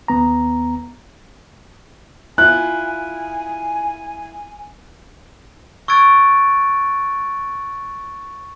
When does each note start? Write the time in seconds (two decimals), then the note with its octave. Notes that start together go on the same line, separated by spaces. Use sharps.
0.08 D#2 B3 A#5
2.38 E4 F4 G#5 F#6
5.88 C#6 E6 F#6 G#6 A6 D7